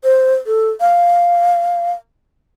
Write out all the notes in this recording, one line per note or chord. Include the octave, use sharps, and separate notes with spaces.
C5
A4
F5